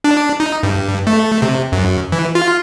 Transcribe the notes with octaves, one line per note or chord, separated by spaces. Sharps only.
D4
D#4
G2
A3
C3
F#2
E3
F4